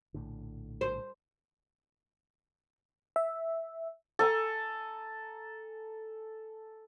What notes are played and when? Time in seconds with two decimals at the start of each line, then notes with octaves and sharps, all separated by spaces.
0.14 A#1 A2 D3
0.81 C5
3.16 E5
4.19 A4 G#5 A#5